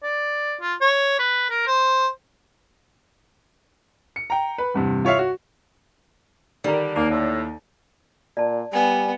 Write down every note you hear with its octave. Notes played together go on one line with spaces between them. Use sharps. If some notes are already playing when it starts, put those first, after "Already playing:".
D5
F4
C#5
B4
A#4
C5
C#7
G5 A#5
B4
E2 G2 C3
F4 C#5 E5 F5
F#4
D3 D#3 G3 A#4
D#2 A#3 D#4
A2
A#2 D5 A5
G3 B3 G#5